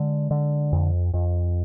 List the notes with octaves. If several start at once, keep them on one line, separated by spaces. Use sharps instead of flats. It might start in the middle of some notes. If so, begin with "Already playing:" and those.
Already playing: D3 G#3
D3
F2
F2